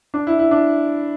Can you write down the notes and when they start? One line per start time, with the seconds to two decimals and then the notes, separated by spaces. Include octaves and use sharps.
0.14 D4
0.27 E4
0.39 E4
0.51 D4